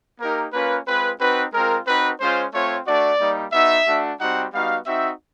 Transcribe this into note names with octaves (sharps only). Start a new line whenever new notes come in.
A#3 D#4 G4 A#4
A#3 C#4 F4 B4
G#3 C4 F4 B4
C4 D#4 F#4 B4
G#3 C4 F4 A#4
C4 D#4 F#4 B4
G#3 C#4 F4 C5
A3 C4 F4 C#5
A3 D4 F#4 D5
G3 A#3 D#4
B3 D#4 F#4 E5
A3 D4 F#4
G3 C4 D#4 F#4 F#5
G3 B3 D#4 F#4 F5
C4 D#4 F#4 E5